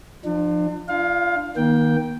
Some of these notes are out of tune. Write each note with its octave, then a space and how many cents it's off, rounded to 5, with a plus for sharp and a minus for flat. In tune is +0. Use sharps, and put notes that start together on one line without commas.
F3 +0 D4 +40
D4 +20 F4 -25 F5 +20
D#3 +0 A#3 +35 G5 +0